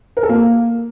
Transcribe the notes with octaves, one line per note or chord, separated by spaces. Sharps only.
A#4
A4
A#3